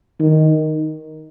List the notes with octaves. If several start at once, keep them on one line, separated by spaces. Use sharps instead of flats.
D#3